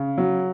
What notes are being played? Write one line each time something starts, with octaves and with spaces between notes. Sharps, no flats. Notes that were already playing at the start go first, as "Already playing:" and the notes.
Already playing: C#3
F#3